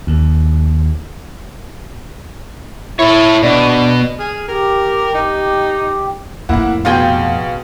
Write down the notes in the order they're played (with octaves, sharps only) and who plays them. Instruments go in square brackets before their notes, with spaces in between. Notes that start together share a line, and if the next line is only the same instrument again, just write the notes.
[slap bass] D#2
[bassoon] E4 [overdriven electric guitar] A4 C#5
[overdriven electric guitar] B2 [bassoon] D4
[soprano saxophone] G#4 [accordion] F6
[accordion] G4 [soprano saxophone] A#4
[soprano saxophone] D#4
[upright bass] F2 A2 [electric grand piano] A#3 E4 F#5
[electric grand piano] B2 F5 [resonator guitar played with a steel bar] F4 G#4 G5